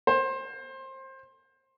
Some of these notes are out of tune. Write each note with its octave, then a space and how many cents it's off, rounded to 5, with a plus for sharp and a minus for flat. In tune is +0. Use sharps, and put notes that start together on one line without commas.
C5 +25